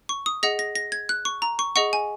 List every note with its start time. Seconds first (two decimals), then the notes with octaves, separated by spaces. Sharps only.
0.09 C#6
0.26 D#6
0.43 G#4 D#5 F#5 A#6
0.59 A#6
0.75 A#6
0.92 G#6
1.09 F#6
1.25 C#6
1.42 A#5
1.59 C#6
1.76 G#4 D#5 F#5 C#6
1.93 G#5